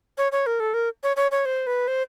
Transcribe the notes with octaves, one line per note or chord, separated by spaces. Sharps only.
C#5
C#5
A#4
A4
A#4
C#5
C#5
C#5
C5
B4
C5